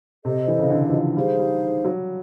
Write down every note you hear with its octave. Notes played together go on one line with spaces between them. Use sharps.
C3 A4 C5 D#5
E3
C#3
D3
E3
F3
G3 D#4 G#4 C5 F5
G3
F#3